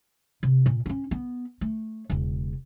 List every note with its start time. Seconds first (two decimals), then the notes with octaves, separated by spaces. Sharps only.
0.43 C3
0.66 A#2
0.86 C4 C#4
1.11 B3
1.61 A3
2.10 E1 C#3